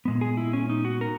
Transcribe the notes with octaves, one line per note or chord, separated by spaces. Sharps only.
A#2 G#3 B3
G#4
E4
C#4
D#4
F#4
A#4